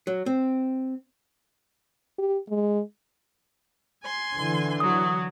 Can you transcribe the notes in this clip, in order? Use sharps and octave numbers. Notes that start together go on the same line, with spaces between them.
F#3
C4
G4
G#3
G#5 C6
D3 E3
F#3 D#6